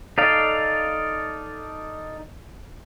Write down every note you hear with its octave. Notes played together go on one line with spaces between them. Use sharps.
D#4 A4 D5 F5